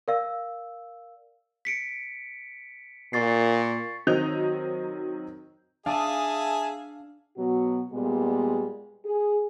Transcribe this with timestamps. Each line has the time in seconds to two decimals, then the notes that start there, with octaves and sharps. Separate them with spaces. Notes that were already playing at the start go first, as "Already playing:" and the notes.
0.08 A#4 D5 F5 E6
1.65 B6 C#7 D7
3.13 A#2 C#6 A6 C7
4.07 D#3 F#3 C4 D#5 G6 F7
5.86 D4 G#4 E5 F5 G#5 A5 D#6
7.37 B2 F#3 B3 F#4
7.93 A#2 G3 G#3 B3
9.05 G#4